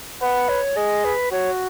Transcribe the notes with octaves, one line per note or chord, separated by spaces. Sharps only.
B4 F#5
C#5
G#4 D#5
B4
F#4 C#5